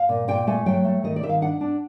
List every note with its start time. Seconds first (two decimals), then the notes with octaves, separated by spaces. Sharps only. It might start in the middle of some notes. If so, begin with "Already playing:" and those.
Already playing: F5
0.09 A#2
0.28 A#2 G5
0.47 A3 G#5
0.66 F#3 G5
0.85 A3
1.03 D#3 D#5
1.16 D5
1.23 D#3 E5
1.29 F5
1.41 D4 F#5
1.61 D4